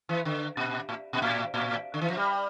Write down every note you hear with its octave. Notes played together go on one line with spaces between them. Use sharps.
E3
D3
A#2
A2
A#2
A2
A2
D3
E3
F3
G3